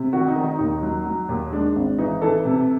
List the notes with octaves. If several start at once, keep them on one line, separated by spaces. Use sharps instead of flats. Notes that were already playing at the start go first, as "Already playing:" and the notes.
Already playing: C3
D#3 F#4
D#4
D#3
D#4
D#2 D#4
F#3
F#3
D#2
G#3 D4
G#1
E3 D#4
E3 A4
C3